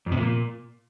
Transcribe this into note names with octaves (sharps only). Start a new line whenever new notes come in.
F2
C3
A#2